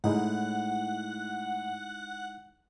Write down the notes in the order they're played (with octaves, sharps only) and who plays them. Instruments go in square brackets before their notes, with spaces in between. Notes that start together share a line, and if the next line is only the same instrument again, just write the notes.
[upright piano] A2 [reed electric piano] G#3 D#4 E4 [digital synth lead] F#5